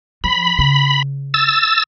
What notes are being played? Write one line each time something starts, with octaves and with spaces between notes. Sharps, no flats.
F3 B5
C#3
E6 A6